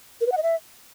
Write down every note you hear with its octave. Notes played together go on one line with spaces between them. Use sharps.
A#4
B4
F#5
D#5
E5